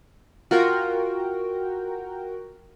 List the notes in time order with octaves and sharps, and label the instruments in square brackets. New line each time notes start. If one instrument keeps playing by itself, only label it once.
[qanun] F4 [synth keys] F#4 A#4 G5